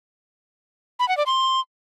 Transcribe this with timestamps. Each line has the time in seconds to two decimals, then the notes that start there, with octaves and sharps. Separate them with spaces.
0.99 B5
1.08 F#5
1.17 D5
1.26 C6